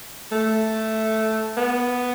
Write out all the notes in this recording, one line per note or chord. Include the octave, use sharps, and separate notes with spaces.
A3
B3